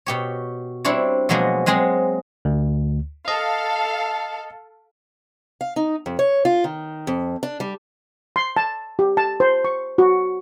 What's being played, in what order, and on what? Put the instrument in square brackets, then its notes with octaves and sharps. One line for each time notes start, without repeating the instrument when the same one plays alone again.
[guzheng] B2 G4 C#5
G3 C4 D4 E4 C#5
B2 F3 F#3 G#3 A#3
F#3 G#3 C4 G#4
[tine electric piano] D2
[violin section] A4 F5 [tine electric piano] D#5
[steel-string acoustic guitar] F5
D#4
F2
C#5
F4
D#3
F2
D4
G3
[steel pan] C6
A5
G4
A5
C5
C#6
F#4